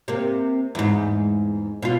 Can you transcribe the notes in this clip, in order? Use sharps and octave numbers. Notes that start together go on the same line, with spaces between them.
C3 A#3
E2 G#2
B2 F4